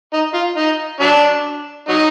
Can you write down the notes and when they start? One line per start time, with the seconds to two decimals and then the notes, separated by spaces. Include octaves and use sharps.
0.13 D#4
0.34 F4
0.56 D#4
1.00 F#3 D4
1.89 F#3 D#4